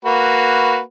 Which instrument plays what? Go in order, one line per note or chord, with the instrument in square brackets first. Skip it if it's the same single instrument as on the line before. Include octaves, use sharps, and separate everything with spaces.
[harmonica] A#3 F#4 B4